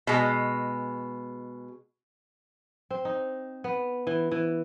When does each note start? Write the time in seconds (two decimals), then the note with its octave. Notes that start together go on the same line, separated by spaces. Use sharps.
0.07 B2 G#3
2.90 C4
3.05 D#4
3.64 B3
4.07 E3
4.31 E3